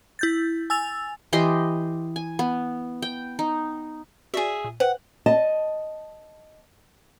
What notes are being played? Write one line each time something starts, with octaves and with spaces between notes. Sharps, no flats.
E4 G6 A6
G#5 E6 A6 F7
E3 G4 D#5 C6
G#5
B3
G5
D#4
F#4 G#4 D5 E5 G#5
A#2
B4 C5 F#5 G5
D#5 A5